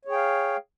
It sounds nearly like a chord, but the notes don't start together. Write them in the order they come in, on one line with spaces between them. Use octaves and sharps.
C#5 G#4 G5 F5